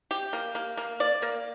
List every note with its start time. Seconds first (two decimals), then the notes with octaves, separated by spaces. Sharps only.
0.11 G4
0.33 A#3
0.55 A#3
0.77 A#3
1.00 D5
1.22 A#3